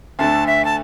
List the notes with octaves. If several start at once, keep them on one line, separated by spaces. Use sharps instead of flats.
D2 D3 A3 A5
E5
A5